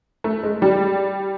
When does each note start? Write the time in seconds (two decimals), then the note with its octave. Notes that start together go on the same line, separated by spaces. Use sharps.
0.24 A3
0.43 G#3
0.62 G3